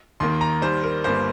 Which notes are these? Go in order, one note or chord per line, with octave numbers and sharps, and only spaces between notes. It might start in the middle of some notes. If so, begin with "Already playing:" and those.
D#2 D#3 A#3 C6
A#5
D#2 D#3 G3 C5
A#4
G1 G2 G3 A#3 C5